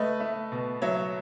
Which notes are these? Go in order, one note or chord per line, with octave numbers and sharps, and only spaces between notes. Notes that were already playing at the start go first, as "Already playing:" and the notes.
Already playing: A3 B4 D#5
A3
B2
F#3 C#5 E5